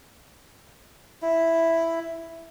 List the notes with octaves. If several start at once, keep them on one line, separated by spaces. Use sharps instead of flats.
E4